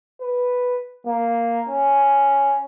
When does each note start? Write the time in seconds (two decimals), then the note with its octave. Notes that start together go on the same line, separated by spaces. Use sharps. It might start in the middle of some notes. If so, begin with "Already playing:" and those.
0.21 B4
1.06 A#3
1.69 C#4